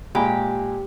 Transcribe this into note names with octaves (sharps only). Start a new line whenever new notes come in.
A#2 G#3 G4 B5